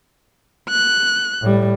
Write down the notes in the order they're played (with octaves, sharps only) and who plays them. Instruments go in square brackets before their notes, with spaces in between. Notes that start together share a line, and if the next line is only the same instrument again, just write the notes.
[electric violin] F#6
[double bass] A2 G3